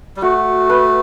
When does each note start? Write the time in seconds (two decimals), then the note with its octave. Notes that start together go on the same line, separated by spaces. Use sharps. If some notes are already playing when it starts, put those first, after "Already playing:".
0.17 G3
0.22 A3 F#4
0.70 B4